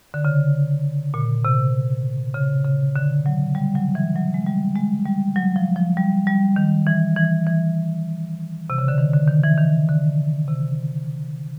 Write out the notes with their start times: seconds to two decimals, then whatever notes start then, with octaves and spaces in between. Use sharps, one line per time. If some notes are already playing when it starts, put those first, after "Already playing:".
0.14 D3
0.25 C#3
1.14 A#2
1.45 C3
2.35 C#3
2.65 C#3
2.96 D3
3.26 F#3
3.55 G3
3.75 F#3
3.95 E3
4.16 F#3
4.34 G#3
4.46 G3
4.76 G#3
5.06 G3
5.36 F#3
5.56 F3
5.76 F3
5.97 G3
6.27 G3
6.56 D#3
6.87 E3
7.16 E3
7.47 E3
8.70 C3
8.78 C#3
8.88 D3
8.98 D#3
9.13 D3
9.28 D#3
9.43 E3
9.58 D#3
9.89 D3
10.48 C3